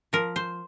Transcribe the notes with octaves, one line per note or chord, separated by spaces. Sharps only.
F3 A#4
C5